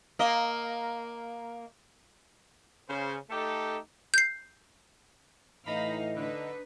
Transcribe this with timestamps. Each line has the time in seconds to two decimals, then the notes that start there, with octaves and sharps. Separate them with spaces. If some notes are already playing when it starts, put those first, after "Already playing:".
0.19 A#3 D#5
2.89 C#3 C5
3.30 A3 D#4 G4 A4
4.14 G6 C7
5.67 A2 E3 A3 D#4 D#5 F5 A#5 B5
6.16 D3 D4 D#4 B4